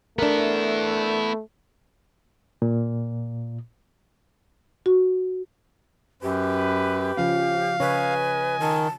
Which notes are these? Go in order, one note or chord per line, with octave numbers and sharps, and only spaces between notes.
A3 B3 D4 E4 A#4
A#2
F#4
F#2 G4 B4
C#3 F3 C#4 F5
C#3 B4 C#5 D#5 G#5
D#3 A5